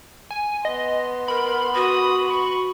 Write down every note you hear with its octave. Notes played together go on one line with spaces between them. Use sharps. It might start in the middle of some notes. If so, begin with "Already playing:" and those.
G#5
B3 D#5 C6
A#4 B5
F#4 D#6
C#6